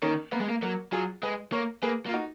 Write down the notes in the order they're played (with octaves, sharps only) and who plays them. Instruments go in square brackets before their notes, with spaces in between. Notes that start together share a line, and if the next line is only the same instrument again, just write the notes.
[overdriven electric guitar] D#3 [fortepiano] A#3 C#4
[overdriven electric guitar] A#3 [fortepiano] B3
[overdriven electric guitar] G#3
A#3
[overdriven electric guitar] F#3 [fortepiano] A#3
[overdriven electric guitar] F#3 [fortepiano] F4 G#4
[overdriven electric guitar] G#3 [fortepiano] G#4 B4
[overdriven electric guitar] A#3 [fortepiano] A#4 C#5
[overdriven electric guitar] A#3 [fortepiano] G#4 B4
[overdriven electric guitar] A#3
[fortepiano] F4
D#4 F#4